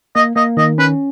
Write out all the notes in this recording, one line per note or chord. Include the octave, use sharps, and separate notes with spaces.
A#3 D#5
A#3 D#5
D#3 D#5
C#4 B4